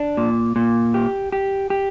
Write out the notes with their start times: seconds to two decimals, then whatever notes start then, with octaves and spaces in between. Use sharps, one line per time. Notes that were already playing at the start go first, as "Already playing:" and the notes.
Already playing: D4
0.17 A#2
0.56 A#2
0.94 G4
1.32 G4
1.70 G4